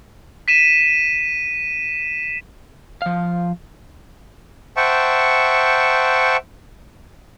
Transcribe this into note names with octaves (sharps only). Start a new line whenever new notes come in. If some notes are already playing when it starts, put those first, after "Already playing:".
B6 D#7 E7
F3 F5
C5 E5 F#5 G5 A5 C#6